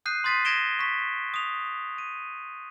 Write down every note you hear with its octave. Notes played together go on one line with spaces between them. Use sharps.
D#6 F#6 G6 C7 D#7
C6 D#6 A6 B6 C7 D#7
G#6 A#6 D7 E7 G7
C#6 B6
D#6 F7
D#7